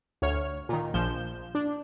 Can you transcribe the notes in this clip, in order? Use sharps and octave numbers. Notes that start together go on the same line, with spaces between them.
D2 C#5 F6
A#2 D#3
A#1 F3 G6 E7
D4